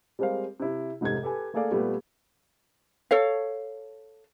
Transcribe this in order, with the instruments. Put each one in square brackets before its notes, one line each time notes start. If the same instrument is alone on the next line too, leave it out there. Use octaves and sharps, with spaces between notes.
[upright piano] G3 G#3 C4 A#4 C5 F5
C3 E4
F1 G#2 C3 A4 G#6
G4 A4 B4 G#5
A3 A#3 G#4 A4 D5 F5
A#2 G3 A3 B3 G4
[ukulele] A4 C#5 F5